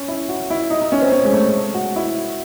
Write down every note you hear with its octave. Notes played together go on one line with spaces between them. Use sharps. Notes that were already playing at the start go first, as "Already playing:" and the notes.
Already playing: C#4
E4
F#4
E4
D#4
D#4
C#4
C4
C#4
G#3
A3
F#4
E4